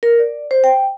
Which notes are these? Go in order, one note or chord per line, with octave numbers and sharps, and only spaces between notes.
A#4
D5
C5
G5